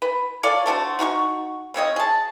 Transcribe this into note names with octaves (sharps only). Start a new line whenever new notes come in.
B4
F4 A4 C#5 D5
A3 D4 F#4 C5
D#4 F#4 A#5 C#6
C#3 C4 C#5 D#5
G#4 A5